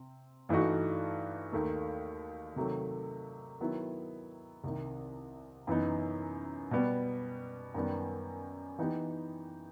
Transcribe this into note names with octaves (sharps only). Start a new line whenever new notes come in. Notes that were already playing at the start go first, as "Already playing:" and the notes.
Already playing: C3 C4
G2 E3 A3 D#4 F#4
D#2 D#3 A3
C3 D#3 F#3 A3
D#3 F#3 B3 E4
C2 C3 D#3
F#2 E3 B3 D#4
B2 G3 B3
F#2 D#3 G3 B3
E3 B3 D#4 G4